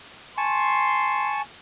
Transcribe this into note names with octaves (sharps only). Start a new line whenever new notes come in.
G#5 A5 C6 C#6